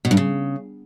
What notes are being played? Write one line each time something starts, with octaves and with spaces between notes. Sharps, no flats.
B2
G2
C#3